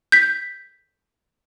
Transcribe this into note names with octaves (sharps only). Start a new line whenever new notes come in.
G6 B6